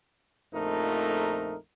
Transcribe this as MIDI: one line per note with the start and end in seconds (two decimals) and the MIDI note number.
0.53 1.55 34
0.53 1.55 41
0.53 1.55 57
0.53 1.55 63
0.53 1.55 70